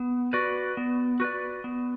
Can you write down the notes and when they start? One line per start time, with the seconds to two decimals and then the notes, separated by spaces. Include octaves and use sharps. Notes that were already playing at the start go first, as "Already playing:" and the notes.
Already playing: B3
0.33 F#4 B4 D5
0.77 B3
1.20 F#4 B4 D5
1.64 B3